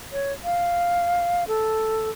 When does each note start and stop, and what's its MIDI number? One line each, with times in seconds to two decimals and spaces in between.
0.13 0.33 73
0.44 1.47 77
1.48 2.10 69